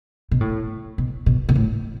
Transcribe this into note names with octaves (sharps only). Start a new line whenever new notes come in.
B2
A2
B2
B2
B2
A2